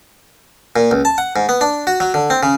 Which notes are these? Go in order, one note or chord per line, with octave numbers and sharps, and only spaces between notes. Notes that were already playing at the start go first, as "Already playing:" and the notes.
A#2
C#2
A5
F#5
G#2
B3
D4
F#4
F#3
D3
C4
C#3